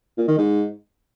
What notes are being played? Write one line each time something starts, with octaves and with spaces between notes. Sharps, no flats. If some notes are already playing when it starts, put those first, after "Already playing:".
A#2
D#3
G#2